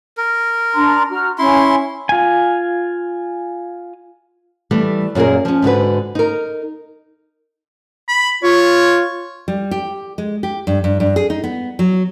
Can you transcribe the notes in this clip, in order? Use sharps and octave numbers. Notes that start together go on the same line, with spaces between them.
A#4
D4 A#5 C6
F#4 A#5 F6
C#4 E4 C6
F4 G#5
E3 G3 A3
F#2 A#2 A#3 G#4 A#4
F3 C#4
G#2 D3 F#4 B4
D#4 A#4
B5
F4 C#5
G3
G4
G#3
G4
G2
G2
G2
G#4
D#4
B3
F#3